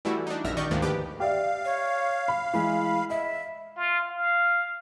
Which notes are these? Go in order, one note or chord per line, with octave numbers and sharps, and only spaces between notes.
E3 G3 A3 E4 F#4
D4 D#4
A#1 F#2 E5 F6 A#6
D#3 D5 D#5 C#6 G6
D2 G#2 D#3 F3 A#3 D4
G4 B4 D6
G4 D5 E5 F5
C#5
B5
E3 G#3 B5
D#5 E5
F4
F5